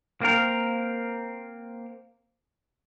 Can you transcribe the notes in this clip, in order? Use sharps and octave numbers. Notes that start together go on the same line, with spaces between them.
A#3 C4 A#4